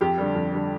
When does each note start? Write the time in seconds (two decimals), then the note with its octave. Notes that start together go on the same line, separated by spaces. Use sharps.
0.01 F2 G4
0.18 D3 G3
0.35 F2
0.52 D3 G3